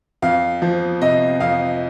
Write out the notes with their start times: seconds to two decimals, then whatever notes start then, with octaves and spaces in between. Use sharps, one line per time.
0.22 F2 F5
0.62 F3
1.01 C3 D#5
1.40 F2 F5